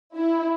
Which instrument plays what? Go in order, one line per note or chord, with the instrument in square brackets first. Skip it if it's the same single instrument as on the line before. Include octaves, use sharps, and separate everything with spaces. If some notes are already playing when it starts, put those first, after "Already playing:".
[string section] E4